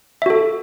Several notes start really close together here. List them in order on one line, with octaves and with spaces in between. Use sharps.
E5 F#4 A4